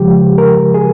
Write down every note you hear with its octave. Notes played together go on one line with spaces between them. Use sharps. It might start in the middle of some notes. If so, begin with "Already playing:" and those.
Already playing: C#3 F3 G#3 G4
A#4
G#4